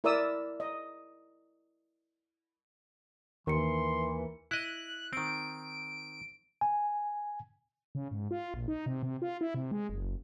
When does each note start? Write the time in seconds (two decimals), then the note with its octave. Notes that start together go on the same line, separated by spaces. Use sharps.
0.04 E4 A#4 D5 E5 D#6 E6
0.60 D#5
3.47 D#2 E3 A#4 C6 C#7
4.51 E4 D#5 F#6
5.13 D#3 C4 D7
6.61 G#5
7.95 C#3
8.11 G#2
8.31 F4
8.54 A#1
8.68 D#4
8.86 C3
9.03 C3
9.22 F4
9.41 E4
9.54 C3
9.71 G#3
9.89 F#1